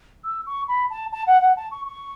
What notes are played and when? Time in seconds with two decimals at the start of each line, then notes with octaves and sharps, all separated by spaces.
0.24 E6
0.46 C#6
0.68 B5
0.90 A5
1.12 A5
1.27 F#5
1.42 F#5
1.57 A5
1.71 C#6
1.86 C#6